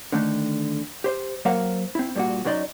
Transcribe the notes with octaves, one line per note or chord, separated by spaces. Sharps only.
D3 D#3 A3
G4 C5
F#3 A#3 A#4 C5 F5 F#5
C4 E4
G2 A#2 F#4
F#2 F#3 A#3 D#4 D5 C6